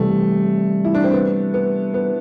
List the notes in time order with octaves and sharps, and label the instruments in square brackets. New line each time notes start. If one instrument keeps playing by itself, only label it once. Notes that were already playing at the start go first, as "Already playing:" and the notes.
Already playing: [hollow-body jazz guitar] C3 E3 G3 [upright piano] A3
[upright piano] E4
D4
C4
B3
B3
B3